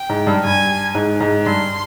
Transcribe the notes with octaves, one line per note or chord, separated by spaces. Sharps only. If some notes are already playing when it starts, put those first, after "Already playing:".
Already playing: G5
G#2
G2
G2 G#5
G#2
G#2
G2 C6